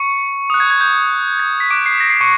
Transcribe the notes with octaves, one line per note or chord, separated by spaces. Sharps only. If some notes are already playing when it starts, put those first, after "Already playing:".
Already playing: C#6 C#7
D#6 F#6
G#6
G#6
G6
G#6
B6
D6 F#6 D7
C7
A#6
C7
C#6 C#7